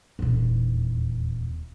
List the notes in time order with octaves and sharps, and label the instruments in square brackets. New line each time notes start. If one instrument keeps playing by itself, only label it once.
[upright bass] D#1 E2